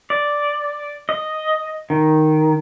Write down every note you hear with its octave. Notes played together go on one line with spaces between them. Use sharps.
D5
D#5
D#3